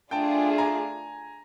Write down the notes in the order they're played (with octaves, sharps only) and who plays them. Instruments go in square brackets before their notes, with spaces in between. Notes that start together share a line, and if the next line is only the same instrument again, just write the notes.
[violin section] A3 D4 F4 G#4 [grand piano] G5 A5
[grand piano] G#5 A#5